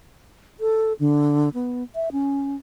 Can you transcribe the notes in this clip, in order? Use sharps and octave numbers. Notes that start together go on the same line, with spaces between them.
A4
D3
B3
E5
C#4